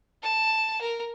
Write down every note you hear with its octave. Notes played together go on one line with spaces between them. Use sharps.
A5
A#4